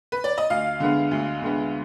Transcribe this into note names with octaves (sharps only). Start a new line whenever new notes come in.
B4
D5
D#5
D2 F5
D3 G#3 B3
D2
D3 G#3 B3